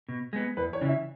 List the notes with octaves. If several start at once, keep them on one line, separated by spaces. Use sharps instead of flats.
B2
G#3 B3
E2 B4
C#5
C#3 E3
E5